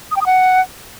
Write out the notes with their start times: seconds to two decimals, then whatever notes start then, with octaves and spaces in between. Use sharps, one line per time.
0.11 D#6
0.16 G5
0.21 D#6
0.26 F#5